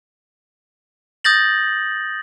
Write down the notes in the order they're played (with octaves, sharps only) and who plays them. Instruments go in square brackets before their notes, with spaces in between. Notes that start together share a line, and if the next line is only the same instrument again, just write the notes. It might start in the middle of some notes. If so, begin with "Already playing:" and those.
[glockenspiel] D#6 G6 A6 A#6 F#7